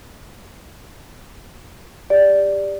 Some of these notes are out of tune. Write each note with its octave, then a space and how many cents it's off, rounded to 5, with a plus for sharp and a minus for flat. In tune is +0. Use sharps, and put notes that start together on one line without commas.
G4 +25 D5 +0